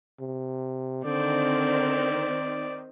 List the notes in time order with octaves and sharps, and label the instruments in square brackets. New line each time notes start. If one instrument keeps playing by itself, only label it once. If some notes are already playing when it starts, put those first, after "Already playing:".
[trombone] C3
[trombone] D3 [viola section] D#3 C4 [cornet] D5